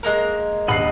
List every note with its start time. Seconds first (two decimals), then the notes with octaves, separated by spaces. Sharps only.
0.03 G#3 A#3 A#4
0.68 D#1 A#1 D#5 F#5 B5 C7